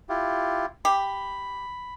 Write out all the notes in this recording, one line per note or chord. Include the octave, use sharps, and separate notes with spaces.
E4 F4 G4
G4 B5